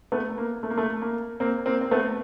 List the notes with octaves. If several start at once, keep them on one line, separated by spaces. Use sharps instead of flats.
A3 B3
A#3
A3
A#3
A3
A#3
A#3 C4
A#3 C4
C4
A3 B3